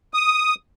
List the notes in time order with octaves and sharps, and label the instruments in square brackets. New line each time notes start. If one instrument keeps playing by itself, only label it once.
[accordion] D#6